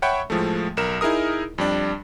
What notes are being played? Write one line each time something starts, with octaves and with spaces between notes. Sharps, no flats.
C#5 E5 F#5 G5 B5 C#6
A2 F3 G#3 A3
B1 A#4 E7
D#4 E4 G#4 A#4 D#6
F2 G3 D4